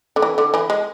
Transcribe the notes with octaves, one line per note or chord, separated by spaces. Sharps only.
D3
E3
D3
E3
G#3